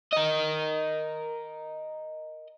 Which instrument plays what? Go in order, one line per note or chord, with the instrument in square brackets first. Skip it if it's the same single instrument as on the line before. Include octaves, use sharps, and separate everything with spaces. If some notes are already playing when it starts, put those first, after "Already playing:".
[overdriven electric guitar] A#4 D#5